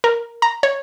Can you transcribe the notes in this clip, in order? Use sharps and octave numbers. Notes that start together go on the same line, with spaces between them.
A#4
A#5
C#5